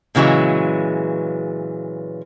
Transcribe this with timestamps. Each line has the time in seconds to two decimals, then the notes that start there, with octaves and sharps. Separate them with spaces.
0.15 A#2 C#3 E3 F#3 G#3